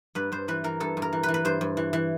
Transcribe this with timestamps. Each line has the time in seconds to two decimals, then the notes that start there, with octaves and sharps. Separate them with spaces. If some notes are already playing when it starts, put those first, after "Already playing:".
0.15 G2 B4
0.32 G2 C5
0.48 E3 B4
0.64 E3 A#4
0.80 G2 A4
0.97 G2
1.02 A#4
1.13 E3
1.23 B4
1.28 E3
1.34 B4
1.45 G2 C5
1.61 G2
1.77 E3
1.93 E3